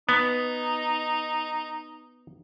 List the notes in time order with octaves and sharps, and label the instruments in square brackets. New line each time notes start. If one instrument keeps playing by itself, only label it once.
[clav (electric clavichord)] B3 [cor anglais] D#4